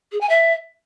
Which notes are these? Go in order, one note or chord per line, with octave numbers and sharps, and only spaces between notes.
G#4
G#5
E5